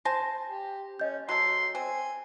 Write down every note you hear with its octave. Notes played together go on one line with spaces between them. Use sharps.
C5 G#5 A5 A#6
G4
C#4 D#5 G6
F#3 A4 C6
C4 G#5